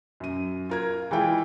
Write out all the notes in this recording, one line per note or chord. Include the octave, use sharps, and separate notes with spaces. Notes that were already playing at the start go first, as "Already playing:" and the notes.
F#2 D#7
F4 A#4 G#6
E3 G#3 E4 F4 G5